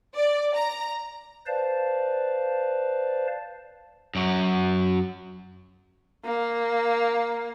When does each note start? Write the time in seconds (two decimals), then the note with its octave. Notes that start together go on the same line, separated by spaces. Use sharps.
0.15 D5
0.55 A#5
1.47 B4 C5 D5 F5 A5
4.15 F#2 F#3
6.25 A#3